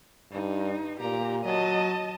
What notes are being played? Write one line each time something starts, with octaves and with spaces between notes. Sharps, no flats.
G2 D#4
A#2 G4 A#5
F#3 D#5 A5